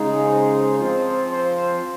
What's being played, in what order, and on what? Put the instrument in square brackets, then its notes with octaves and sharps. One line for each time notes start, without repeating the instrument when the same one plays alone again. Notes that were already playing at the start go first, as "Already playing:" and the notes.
Already playing: [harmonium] C#3 G#3 D#4 G#4
[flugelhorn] C5
[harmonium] F3 C4 F4 [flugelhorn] C5
[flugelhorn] C5